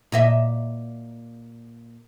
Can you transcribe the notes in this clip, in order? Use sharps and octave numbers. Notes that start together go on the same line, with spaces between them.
A#2 D#5 E5